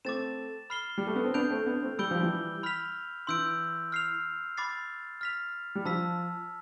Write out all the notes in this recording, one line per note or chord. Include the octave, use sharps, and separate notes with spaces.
A3 C4 D6 A6 E7
B5 F6 C7 G7
G3
A3
B3
C4
B3 D4 G6 D7 F7
A3 C4
B3 D4
A3 C4
G3 B5 E6 G6 D7 G7
F3
E3 G3
B5 F6 B6 F7
E3 C6 E6 G6 D7
F6 C7 F7
B5 D6 A6 C7
F6 B6 F7
G3
F3 A5 E6 B6